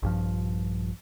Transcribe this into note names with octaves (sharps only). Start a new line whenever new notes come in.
A#1 G2 F3